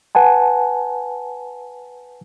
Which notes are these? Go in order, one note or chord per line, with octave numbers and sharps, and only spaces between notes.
B4 F#5 G#5 A5